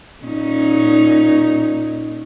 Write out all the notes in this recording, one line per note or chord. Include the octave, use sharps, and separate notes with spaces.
A#2 C#4 D#4